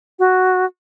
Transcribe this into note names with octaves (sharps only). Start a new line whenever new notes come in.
F#4